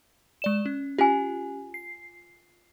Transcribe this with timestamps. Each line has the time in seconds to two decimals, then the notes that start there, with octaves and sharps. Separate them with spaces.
0.42 G#3 D5 E7
0.66 C#4
0.98 C#4 F4 G4 G#5
1.74 C7